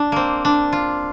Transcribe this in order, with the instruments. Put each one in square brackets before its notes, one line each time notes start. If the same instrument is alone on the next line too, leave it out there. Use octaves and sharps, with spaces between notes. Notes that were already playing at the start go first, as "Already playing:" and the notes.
Already playing: [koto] D4
A#3 C4
D4
F4